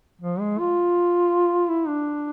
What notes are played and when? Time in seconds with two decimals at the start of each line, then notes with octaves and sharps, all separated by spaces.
0.22 F3
0.40 G#3
0.59 F4
1.69 E4
1.87 D4